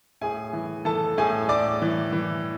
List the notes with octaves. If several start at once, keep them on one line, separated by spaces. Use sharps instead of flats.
A2 G#4 G#5
E3
E3 A4 A5
A2 G#4 G#5
A2 D5 D6
E3
E3